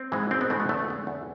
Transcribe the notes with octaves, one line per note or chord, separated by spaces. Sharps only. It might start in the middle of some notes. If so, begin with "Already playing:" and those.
Already playing: C4
G#2 E3 G#3
G#1 C4
B3
G#2 E3 G#3 A3
B3
E2 A3
D3 G#3
E2